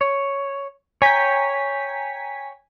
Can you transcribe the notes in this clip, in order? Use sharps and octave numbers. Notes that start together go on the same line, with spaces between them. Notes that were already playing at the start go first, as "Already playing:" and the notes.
C#5
C#5 G5 G#5 A#5 B6